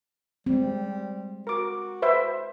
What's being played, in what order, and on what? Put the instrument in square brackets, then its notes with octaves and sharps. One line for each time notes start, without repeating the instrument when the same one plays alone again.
[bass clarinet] G3 [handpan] G#3 C4
[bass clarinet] F#4 [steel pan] A#4 D6
[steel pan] B4 C5 E5